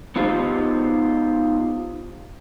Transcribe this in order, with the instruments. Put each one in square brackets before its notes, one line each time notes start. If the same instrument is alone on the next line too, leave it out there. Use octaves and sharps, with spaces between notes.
[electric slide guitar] B3 D#4 F4 G4 C5